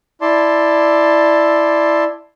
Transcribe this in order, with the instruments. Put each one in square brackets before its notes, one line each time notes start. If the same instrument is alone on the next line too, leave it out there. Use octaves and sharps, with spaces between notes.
[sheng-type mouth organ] E4 D5 A5 C6